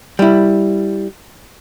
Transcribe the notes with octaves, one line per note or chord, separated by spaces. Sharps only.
G3 E4